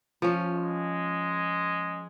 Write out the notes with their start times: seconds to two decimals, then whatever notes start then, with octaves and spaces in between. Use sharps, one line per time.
0.22 F3 C#4
0.52 G#3